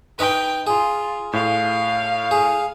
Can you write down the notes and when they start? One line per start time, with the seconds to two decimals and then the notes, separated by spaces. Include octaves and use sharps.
0.19 D#4 B4 G5
0.67 F4 G#4
1.33 A2 F5
2.31 G#4